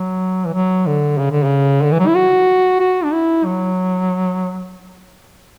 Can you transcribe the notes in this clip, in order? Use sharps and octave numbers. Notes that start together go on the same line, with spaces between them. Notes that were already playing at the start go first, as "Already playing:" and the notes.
Already playing: F#3
E3
F#3
D3
C#3
D3
C#3
D3
E3
F#3
E4
F#4
F#4
D4
E4
F#3